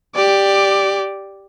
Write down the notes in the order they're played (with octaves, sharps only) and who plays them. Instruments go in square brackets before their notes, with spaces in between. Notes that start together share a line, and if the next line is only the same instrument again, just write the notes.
[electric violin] G4 D5